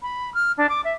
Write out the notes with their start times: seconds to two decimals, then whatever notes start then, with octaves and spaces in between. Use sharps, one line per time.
0.02 B5
0.34 F6
0.57 D4
0.69 D6
0.84 E5